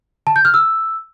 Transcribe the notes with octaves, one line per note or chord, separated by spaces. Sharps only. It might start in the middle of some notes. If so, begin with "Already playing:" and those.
A5
G6
F6
E6